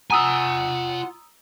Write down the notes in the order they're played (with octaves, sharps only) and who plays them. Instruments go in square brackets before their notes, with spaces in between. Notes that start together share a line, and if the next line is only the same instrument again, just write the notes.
[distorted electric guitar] F4 G#5 [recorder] F#5 [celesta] A#5 D#6 E6